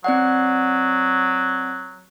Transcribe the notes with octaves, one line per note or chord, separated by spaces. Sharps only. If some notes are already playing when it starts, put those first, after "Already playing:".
F#3 C4 D5 F#5